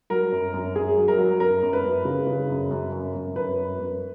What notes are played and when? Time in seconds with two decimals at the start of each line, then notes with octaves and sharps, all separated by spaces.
0.10 F#3 A#4
0.32 F#2
0.54 F#2
0.75 F#2 G#4
0.97 F#3
1.08 A#4
1.18 F#3
1.40 F#2 A#4
1.62 F#2
1.73 B4
1.84 F#2
2.05 C#3
2.27 C#3
2.49 F#2
2.71 F#2
2.92 F#2
3.14 F#2
3.36 F#2 B4
3.57 F#2
3.79 F#2